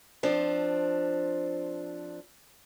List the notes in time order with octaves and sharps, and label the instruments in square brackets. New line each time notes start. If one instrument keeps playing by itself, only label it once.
[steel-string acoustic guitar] F3 C4 D4